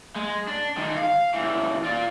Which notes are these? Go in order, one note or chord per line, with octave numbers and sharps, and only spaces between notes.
G#3
D4
D#3 G#3
F5
C#2 E3
F4 D5